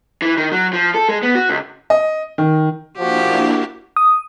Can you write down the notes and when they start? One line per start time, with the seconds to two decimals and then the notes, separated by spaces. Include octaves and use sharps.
0.22 E3
0.37 D#3
0.52 F#3
0.73 F3
0.94 A4
1.09 G#3
1.23 B3
1.35 F#4
1.50 C#2
1.90 D#5
2.38 D#3
2.99 F3 A#3 D4 E4 F#4 G4
3.96 D#6